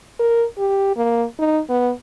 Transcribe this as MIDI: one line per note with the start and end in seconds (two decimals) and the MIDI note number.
0.20 0.45 70
0.58 0.95 67
0.96 1.24 58
1.39 1.60 63
1.70 1.91 59